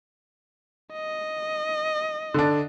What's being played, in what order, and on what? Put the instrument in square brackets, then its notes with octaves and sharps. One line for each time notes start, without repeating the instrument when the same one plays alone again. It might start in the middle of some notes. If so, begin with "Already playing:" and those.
[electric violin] D#5
[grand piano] D3 D4